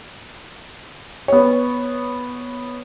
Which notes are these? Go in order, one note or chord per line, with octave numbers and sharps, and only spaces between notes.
B3 C#5